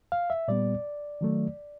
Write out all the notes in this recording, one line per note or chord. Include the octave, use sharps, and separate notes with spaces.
F5
E5
A#2 G3 B3 D5
D#3 F#3 A3